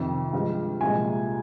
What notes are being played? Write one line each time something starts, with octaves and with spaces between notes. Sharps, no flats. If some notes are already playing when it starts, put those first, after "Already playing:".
Already playing: F2 C3 D#3
G2 F3 G#3
C2 A#2 F3 G#3 G#5